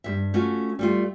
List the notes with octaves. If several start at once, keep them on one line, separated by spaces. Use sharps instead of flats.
G2 B2 E5
A3 C#4 F4 F#4
G3 A3 F4